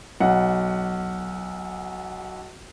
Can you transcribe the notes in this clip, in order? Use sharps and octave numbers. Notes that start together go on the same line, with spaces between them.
B1 F#5